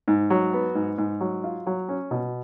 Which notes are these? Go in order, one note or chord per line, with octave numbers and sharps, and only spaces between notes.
G#2
F#3
B3
G#2
G#2
F#3
F4
F#3
C#4
B2